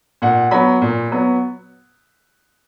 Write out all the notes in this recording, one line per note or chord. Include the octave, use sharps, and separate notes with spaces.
A#2 F#5
F#3 B3 B5
A#2
F#3 B3